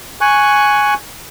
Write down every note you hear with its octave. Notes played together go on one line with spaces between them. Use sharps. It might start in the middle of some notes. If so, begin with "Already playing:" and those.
G#5 C#6 F#6